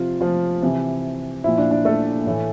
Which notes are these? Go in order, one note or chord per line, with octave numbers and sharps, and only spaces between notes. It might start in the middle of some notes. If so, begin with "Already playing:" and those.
Already playing: C3 F3 F4
F3 F4
C3 E3
A#2 F3 E4
D4
D4
A3 A4
A2 E3